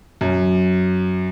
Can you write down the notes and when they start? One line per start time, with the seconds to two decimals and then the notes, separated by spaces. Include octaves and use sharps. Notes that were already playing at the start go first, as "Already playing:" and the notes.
0.21 F#2